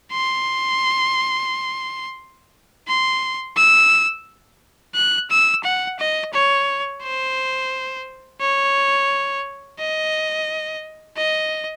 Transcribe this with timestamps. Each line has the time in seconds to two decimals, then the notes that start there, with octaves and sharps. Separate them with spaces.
0.12 C6
2.88 C6
3.57 E6
4.95 F#6
5.31 E6
5.64 F#5
6.00 D#5
6.33 C#5
7.02 C5
8.41 C#5
9.79 D#5
11.17 D#5